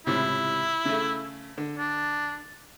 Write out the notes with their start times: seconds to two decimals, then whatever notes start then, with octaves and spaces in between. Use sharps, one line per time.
0.07 C#2 A2 C3 E4
0.85 C#3 A3
1.58 D3
1.78 D4